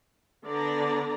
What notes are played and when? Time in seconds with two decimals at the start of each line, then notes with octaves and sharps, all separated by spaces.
0.44 D3 B3 D5 A#5